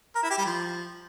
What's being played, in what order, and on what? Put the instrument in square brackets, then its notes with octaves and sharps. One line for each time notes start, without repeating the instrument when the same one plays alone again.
[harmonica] A#4
E4
G4
G3
F3